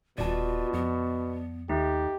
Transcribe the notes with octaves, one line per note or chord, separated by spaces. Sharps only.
D#1 B2 F4 D5 A5
F2 B3
D#2 A3 D#4 G4